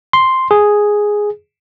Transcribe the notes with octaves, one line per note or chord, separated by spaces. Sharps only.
C6
G#4